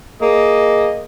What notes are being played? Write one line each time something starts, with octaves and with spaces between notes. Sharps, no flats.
A#3 G#4 D#5